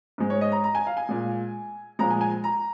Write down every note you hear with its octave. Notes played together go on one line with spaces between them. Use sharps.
G#2 G#3
C#5
D#5
A#5
A#5
G#5
F5
G#5
A#2 G#3
A#2 F3 G#3 A#5
G#5
G#5
A#5